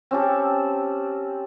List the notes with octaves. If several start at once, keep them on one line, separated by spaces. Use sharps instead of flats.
C4 C#4 G4 A4